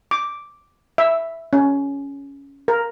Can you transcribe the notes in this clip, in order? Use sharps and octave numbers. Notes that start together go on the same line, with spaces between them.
D6
E5
C#4
A#4